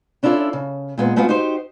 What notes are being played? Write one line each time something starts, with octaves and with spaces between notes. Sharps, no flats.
C#4 D4 E4 F4 A4 D5
C#3
A#2 G#3 B3
G#3 A3 B3 C4 F4 F#4
D#4 F#4 G4 C5